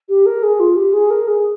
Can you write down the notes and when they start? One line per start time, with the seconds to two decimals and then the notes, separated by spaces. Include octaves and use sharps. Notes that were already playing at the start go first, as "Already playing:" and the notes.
0.09 G4
0.26 A#4
0.43 G#4
0.59 F4
0.76 G4
0.93 G#4
1.10 A#4
1.27 G#4